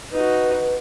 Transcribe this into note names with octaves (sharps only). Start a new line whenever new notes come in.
D#4 F#4 B4